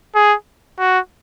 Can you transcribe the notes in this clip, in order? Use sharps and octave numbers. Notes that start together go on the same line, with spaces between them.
G#4
F#4